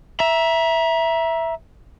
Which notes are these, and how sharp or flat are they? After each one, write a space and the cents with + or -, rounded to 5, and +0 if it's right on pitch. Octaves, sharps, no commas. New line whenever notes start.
E5 +0 A#5 +30